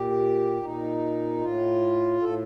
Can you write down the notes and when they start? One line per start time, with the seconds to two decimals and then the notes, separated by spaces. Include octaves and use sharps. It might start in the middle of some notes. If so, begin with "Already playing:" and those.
Already playing: A#2 G4
0.62 A#2 D#4
1.41 A2 F4
2.21 A2 A4